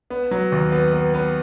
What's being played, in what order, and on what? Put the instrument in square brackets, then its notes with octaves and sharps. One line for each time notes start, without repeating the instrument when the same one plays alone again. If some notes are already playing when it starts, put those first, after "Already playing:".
[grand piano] B3
F#3
D#2
B3
B3
B3